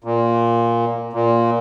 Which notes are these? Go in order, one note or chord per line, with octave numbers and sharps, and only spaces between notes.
A#2
A#2